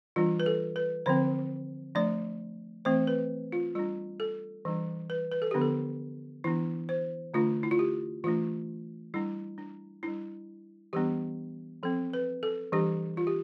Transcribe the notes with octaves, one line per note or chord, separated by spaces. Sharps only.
E3 G3 D4 F4
B4
A4
B4
D3 F3 C4 C5
F3 A3 D4 D5
E3 A3 C4 C5
B4
F4
G3 D4 F4
A4
E3 G3 D4
B4
B4
A4
D3 F3 B3 D4 G4
A4
E3 B3 D4 E4
C5
D3 A3 D4 F4
E4
F4
G4
E3 A3 D4 F4
G3 D4 E4
D4
G3 D4 E4
E3 G3 B3 D4 G4
F3 C4 A4
B4
A4
E3 G3 D4 G4
F4
G4